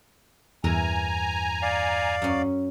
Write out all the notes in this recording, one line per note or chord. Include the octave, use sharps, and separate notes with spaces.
E2 G2 E3 A#4 G#5 A#5
D5 F5
F#2 C#4